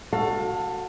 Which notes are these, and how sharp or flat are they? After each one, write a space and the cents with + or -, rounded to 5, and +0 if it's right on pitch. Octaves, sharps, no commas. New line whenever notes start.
F#4 +0 A4 +20 F5 +35